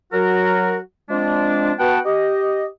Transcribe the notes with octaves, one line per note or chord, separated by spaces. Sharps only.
F#3 F#4 A#4
F3 G#3 C4 D4
B3 F#4 B4 F#5 G5 A5
G4 D#5